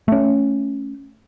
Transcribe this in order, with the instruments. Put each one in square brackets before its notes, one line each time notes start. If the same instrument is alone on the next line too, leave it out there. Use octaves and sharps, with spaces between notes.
[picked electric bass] A3 C#4